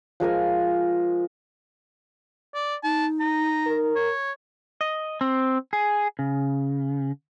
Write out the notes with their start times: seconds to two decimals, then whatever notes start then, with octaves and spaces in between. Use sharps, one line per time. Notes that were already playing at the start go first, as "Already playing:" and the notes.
0.20 F3 G#3 A#4 G#5
2.54 D5
2.84 D#4 A5
3.20 A#5
3.66 A#4
3.96 C#5
4.81 D#5
5.21 C4
5.73 G#4
6.19 C#3